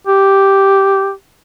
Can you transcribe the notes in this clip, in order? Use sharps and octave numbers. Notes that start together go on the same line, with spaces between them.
G4